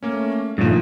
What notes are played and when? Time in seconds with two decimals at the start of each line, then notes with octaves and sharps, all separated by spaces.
0.03 A3 A#3 C#4
0.58 G2 A#2 D#3 F3 A3